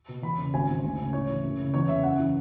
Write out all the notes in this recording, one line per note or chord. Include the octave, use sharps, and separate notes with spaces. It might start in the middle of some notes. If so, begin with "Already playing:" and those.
B2
E2 B5
C#3
G#1 G#5
G#2
D2
C#3
A2 C#5
E3
F#2
C#3
E2 C#5
C#3 E5
F#2 F#5
E3